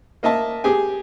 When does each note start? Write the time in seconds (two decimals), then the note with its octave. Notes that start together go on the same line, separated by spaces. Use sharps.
0.23 A#3 D#5 E5 A5
0.64 G4 G#4 G#5